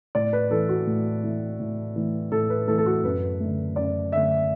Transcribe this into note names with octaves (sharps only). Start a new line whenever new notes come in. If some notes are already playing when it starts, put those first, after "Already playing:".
A2 D5
B4
E3 A3 A4
F#4
A2
E3 A3
A2
E3 A3
A2 A4
B4
E3 A3 A4
A4
F#4
F#2 B4
D3 A3
F#2 D5
D3 A3 E5